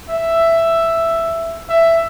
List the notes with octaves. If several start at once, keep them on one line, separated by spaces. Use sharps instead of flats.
E5
E5